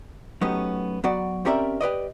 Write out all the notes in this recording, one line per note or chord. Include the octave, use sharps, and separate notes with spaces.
F#3 A3 B3 C#4 D#4 G4
F#3 B3 F#4 D5
C4 C#4 G4 A#4 D5 E5
G4 B4 D5 D#5